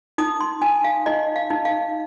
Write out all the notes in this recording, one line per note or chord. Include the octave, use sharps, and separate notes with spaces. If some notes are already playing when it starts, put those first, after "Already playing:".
D#4 D#6
C6
D#4 G#5
F5
D#4 D#5
F5
D#4
F5